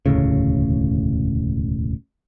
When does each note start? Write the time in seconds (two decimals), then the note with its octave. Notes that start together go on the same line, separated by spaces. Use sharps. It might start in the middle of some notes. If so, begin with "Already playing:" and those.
0.06 E1 D2 A2 C#3